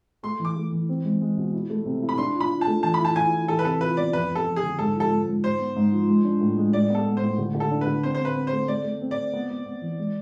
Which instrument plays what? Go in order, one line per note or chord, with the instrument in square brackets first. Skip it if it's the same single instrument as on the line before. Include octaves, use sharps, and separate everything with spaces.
[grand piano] A3 [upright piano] C6
[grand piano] E3
[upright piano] D6
[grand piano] A3
E3
C4
G#3
G#3
B2
E4
A3
C3
E4
[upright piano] B5
[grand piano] D4 [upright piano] C6
[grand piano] F4
[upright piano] B5
[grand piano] F4
[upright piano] A5
[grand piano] A3
[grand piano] E3 [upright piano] A5
[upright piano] B5
[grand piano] E4 [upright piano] A5
[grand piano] E4 [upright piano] G#5
[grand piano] E4
[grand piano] E3 [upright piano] A4
[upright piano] B4
[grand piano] C3 [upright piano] A4
[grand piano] F4 [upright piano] B4
[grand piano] B3 [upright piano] D5
[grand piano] F2 [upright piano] B4
[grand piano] F2
[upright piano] A4
[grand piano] F2
[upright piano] G#4
[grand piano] D3
[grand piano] G#2 [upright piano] A4
[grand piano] F3
[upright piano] A4
[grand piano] G#2
G#2
[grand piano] G#2 [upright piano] C5
[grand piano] B3
G#2
F3
G#3
D4
A2
G#3
[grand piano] A2 [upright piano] D5
[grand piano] B3 [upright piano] A4
[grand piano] B3
[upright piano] C5
[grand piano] A2
D3
D3
[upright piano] A4
[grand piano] D4
[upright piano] B4
[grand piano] D3
[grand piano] C4 [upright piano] C5
[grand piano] C4 [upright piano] C5
[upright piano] B4
[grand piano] C4
[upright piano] C5
[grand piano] A3
[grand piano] A3 [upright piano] D5
[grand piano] A3
C4
[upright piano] D5
[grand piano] C4
B3
B3
B3
E3
G#3